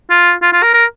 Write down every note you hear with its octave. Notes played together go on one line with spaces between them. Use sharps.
F4
F4
F4
A#4
A#4